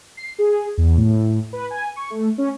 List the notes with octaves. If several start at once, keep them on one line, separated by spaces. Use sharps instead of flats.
C7
G#4
E2
A2
B4
G#5
C#6
A3
C#4